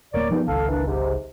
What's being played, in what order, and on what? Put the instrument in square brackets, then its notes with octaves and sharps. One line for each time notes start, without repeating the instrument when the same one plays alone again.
[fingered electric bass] D1 A#3 [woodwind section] A#4 C#5 D5
[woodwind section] E2 G2 D#4 [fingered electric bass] F3 A#3 B3
[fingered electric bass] G#1 C#2 [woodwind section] A4 F5
[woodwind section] E3 A#3 D4
G#2 C3